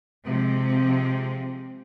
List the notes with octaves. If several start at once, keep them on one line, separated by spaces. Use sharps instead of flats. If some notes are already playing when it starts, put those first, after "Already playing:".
C3 F3 G#3 C4